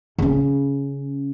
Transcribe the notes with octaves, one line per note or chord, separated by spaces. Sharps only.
C#3 C#4